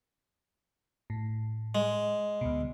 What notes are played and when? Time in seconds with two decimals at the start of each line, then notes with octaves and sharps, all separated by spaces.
1.10 A2
1.75 G#3
2.41 D2 B2